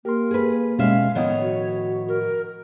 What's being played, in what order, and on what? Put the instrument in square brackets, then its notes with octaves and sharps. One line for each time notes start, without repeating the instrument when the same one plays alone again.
[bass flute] A#3 [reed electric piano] G4 C6 [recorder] A#4
[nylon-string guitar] G#4 B4
[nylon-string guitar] D#2 G#3 E5 [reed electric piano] B2 C#4 F6 [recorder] F5
[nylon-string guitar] A2 D#3 B3 [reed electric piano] F3 D#5 D#6 [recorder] C#5
[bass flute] F#4
[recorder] A#4